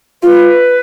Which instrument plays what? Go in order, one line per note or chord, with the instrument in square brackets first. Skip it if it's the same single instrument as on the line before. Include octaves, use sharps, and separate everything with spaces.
[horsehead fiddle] F4 [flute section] B4